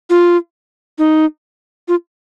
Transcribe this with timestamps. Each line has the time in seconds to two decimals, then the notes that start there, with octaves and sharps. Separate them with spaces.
0.10 F4
0.98 D#4
1.88 F4